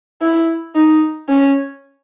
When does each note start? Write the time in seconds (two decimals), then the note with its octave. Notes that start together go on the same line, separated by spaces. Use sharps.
0.22 E4
0.75 D#4
1.29 C#4